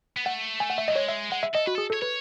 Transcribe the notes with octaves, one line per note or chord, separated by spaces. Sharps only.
B3
A3 F#5
G#5
F#5
E5
F#3 D#5
G#3 C#5
E5
G#3 F#5
E5
A4 D#5
F#4 B4
G#4 A4
A4 C#5
B4 C#5